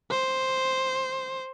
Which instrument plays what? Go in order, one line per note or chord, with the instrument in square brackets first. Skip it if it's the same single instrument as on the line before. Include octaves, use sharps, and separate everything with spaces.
[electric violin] C5